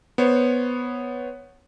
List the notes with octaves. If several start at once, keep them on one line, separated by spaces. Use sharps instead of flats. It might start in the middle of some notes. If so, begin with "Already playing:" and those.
B3 C5 C#5